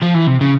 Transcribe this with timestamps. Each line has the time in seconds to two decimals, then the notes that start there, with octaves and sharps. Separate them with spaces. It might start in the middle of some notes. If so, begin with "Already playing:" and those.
0.02 F3
0.14 E3
0.27 C3
0.41 C#3